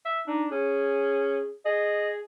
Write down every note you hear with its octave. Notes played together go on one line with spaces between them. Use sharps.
E5
D4 D#4
C#4 G#4
G#4 D#5